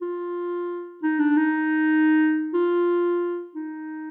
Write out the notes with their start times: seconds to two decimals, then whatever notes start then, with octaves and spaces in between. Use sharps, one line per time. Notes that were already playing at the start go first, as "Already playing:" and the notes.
0.02 F4
1.03 D#4
1.19 D4
1.37 D#4
2.54 F4
3.55 D#4